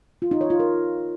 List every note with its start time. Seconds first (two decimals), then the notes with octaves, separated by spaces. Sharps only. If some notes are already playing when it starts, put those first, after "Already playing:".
0.22 F4
0.31 D#4
0.41 C#5
0.50 F4
0.60 A#4